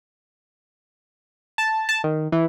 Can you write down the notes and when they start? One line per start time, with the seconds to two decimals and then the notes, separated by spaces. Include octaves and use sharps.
1.58 A5
1.89 A5
2.04 D#3
2.32 E3